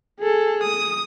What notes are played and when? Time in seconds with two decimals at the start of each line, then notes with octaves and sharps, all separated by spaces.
0.20 G#4 A4
0.63 D#6